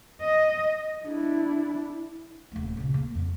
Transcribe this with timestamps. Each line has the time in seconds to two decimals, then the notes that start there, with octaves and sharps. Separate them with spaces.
0.22 D#5
1.06 D4 E4
2.52 D#1 A3
2.77 A#2 C#3
2.94 A#3
3.15 F2 G3